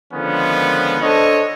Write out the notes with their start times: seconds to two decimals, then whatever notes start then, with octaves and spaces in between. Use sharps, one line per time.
0.14 D3 D#3 F3 G#3 B3 C#4
1.02 D4 A4 C5 C#5 D#5